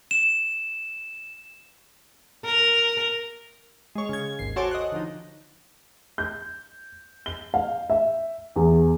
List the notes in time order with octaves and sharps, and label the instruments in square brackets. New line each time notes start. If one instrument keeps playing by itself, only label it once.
[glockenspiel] E7
[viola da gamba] A#4
[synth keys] G#3 C#5
C#3 G#6
G#1 D#2 C7
F#4 A4 C5 C#5 G#5 D6
D#5 F#6
D3 F3 D#4
[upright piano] G6
G7
F5
E5
E2